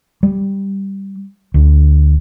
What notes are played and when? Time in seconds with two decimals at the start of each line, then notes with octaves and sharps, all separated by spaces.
0.23 G3
1.54 D2